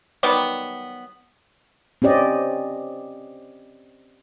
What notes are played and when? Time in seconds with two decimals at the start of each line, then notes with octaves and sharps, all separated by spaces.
0.23 D#3 F#3 G3 B3
2.02 C4 C#4 G4 D5 D#5